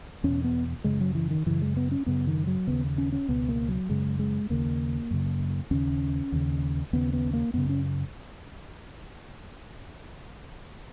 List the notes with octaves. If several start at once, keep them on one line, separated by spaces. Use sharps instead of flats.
E2 B2 C#4
B3
F#2 C#3 G#3
F#3
E3
D#3
F#2 C#3 E3
G#3
B3
C#4
F#2 C#3 B3
D#3
F#3
D#2 C#3 B3
C#4
C#4
C#2 B2 B3
A#3
F#3
F#2 C#3 G#3
G#3
D#2 C#3 A#3
F#2 C#3
D#2 C#3 C#4
D#2 C#3
D#2 C#3 B3
B3
A#3
F#2 C#3 B3
C#4